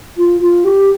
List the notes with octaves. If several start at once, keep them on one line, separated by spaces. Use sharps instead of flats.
F4
F4
G4